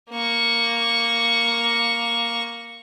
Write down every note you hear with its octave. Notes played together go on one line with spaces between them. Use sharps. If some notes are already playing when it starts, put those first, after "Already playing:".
A#3 C#6